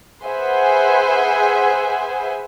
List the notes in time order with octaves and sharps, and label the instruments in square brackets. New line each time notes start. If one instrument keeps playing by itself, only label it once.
[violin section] G#4 B4 C5 E5 F#5 G#5